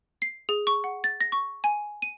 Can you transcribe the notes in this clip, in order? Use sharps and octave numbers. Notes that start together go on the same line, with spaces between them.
C7
G#4
C#6
F#5
A6
A#6
C#6
G#5
D#7